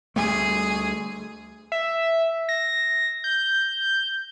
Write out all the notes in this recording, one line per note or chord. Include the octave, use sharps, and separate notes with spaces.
D2 G3 A3 G#4
E5
A#6
G6